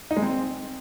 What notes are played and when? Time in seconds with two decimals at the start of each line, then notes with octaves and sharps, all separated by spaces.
0.11 D#4
0.17 G#3
0.22 C4